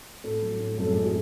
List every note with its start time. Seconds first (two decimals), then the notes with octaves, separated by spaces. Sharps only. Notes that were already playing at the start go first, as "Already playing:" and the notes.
0.24 A2 A4
0.42 F#3
0.60 A2
0.78 F#2 A4
0.92 G#3 G#4
1.06 G#4